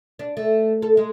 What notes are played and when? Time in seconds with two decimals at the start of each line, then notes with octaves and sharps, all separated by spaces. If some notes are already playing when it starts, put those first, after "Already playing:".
0.19 D4
0.37 A3
0.82 A4
0.97 G#3